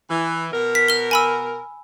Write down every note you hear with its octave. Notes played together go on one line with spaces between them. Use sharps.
E3
B2 A#4
B6
F6 G7
G#5 B5 E6